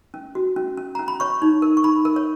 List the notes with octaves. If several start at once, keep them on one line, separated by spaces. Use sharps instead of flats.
C#4
F#4
C#4
C#4
C#4 A#5
B5
C#5 C#6
D#4
A#4
C#6
D#4 B5
A#4
C#5